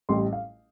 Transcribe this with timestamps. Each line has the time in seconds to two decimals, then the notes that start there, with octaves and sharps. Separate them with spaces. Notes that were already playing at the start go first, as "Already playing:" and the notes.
0.09 A1 A2 G3 C6
0.33 F5